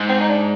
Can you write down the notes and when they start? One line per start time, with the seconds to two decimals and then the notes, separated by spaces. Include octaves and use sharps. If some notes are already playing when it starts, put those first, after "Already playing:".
Already playing: G#2
0.09 C4
0.21 D#4
0.29 D4